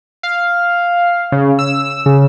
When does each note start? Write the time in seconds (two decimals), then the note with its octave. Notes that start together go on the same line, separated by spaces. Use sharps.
0.23 F5
1.32 C#3
1.59 E6
2.06 C#3